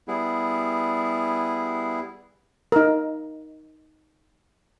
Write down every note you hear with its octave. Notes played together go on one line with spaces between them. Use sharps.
G3 B3 E4 G#4
D#4 A#4